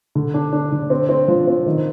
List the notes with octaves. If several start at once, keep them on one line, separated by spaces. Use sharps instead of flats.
D3
D4
D4
D3
C4
C4
F3
C4
D#3